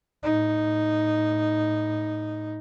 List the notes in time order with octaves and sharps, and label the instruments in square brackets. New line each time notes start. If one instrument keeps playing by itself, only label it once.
[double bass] A2 D#4